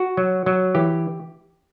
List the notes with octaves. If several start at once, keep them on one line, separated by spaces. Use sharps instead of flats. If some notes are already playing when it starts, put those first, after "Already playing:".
Already playing: F#4
F#3
F#3
E3 G4